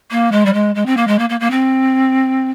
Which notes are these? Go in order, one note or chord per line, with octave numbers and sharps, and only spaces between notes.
A#3
G#3
G3
G#3
G#3
C4
A#3
G#3
A#3
A#3
A#3
C4